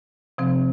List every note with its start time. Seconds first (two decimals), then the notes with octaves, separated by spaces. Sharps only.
0.38 C3 F3 C4